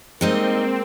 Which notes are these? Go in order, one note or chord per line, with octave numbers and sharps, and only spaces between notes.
G3 G#3 A#3 C4 D#4 D#5